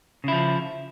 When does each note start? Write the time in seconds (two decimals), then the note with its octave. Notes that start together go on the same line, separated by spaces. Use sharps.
0.24 C#3
0.28 E4
0.32 F3